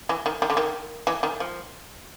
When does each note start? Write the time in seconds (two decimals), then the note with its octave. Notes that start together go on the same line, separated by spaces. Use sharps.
0.09 E3
0.26 D#3
0.42 D#3
0.50 D3
0.57 D#3
1.07 E3
1.23 D#3
1.40 F3